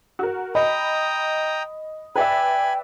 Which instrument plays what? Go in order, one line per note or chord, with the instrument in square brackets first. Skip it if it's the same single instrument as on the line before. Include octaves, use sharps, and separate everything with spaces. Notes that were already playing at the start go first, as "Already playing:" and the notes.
[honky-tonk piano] F#4 A#4
[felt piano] D#5 [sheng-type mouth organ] G5 A#5 D#6 [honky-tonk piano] B5
[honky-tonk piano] B4 D5 E5 [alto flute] G5 [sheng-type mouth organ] G#5 B5